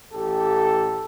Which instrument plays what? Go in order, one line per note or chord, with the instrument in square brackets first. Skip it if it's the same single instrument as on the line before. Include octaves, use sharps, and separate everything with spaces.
[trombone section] A1 G4 A4